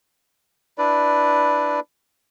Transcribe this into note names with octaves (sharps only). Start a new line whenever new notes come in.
D4 E4 B4 D5